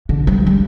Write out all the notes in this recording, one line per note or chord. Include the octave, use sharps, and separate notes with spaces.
D3
G3
G3